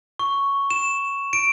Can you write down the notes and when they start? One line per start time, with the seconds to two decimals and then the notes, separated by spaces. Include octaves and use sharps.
0.19 C#6
0.70 E7
1.33 D7